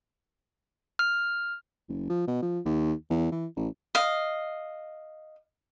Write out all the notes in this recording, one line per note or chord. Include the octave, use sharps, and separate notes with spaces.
F6
F#1
F3
B2
F3
D#2
E2
E3
A1
D#5 F5